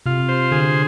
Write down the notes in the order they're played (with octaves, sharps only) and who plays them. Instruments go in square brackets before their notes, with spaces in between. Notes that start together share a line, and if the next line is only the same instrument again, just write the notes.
[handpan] C3 [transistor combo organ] F4
[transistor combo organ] C5
[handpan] D3 [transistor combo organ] G#4